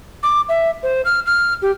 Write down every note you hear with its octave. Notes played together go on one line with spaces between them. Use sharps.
D6
E5
C5
F6
F6
G4